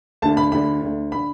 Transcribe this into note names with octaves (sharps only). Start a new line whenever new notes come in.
D2 D3 A5
B5
D2 D3 B5
D2 D3
D3 B5